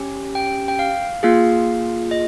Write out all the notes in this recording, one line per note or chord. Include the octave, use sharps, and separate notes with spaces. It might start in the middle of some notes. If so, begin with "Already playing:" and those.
Already playing: C#4 G4
G5
G5
F5
A#3 F4 G#4 F5
D#5